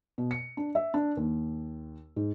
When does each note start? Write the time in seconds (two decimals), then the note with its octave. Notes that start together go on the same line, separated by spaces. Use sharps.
0.18 B2
0.31 C#7
0.57 D4
0.75 E5
0.94 D4
1.17 D#2
2.16 G#2